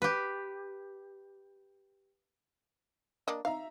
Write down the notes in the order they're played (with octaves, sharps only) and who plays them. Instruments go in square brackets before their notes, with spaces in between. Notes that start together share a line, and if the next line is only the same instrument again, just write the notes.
[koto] G4 B4
[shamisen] A#3 D4 D#5
[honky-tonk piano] D#4 E5 A#5 [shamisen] F5